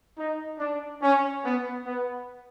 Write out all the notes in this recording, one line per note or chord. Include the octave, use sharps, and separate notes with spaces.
D#4
D4
C#4
B3
B3